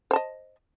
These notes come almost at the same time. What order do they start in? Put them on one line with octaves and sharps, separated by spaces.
C5 A5 D#5